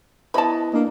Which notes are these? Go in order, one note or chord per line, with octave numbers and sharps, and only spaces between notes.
B3 E4 D#5 A5 B5
A#3 D4 D#5